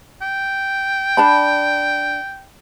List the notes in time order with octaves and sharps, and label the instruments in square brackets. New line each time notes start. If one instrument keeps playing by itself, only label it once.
[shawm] G5
[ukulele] D4 A5 B5